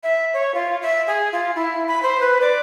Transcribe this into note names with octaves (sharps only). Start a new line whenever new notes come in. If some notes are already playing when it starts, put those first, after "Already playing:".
E5
C#5
F4
E5
G#4
F4
E4
B5
C5
B4
D5